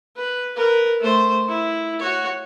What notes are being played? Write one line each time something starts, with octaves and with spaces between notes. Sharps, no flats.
B4
A#4 B4
A3 C5
E4
F#4 C#5